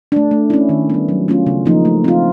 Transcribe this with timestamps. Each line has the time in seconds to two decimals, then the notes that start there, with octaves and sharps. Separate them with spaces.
0.12 A3 D4
0.31 A3
0.50 C#4 E4
0.69 D#3
0.90 G3 B3
1.09 F#3
1.28 A3 C#4 F4
1.47 C#3
1.66 F3 A#3 D#4
1.85 A3
2.04 C4 F4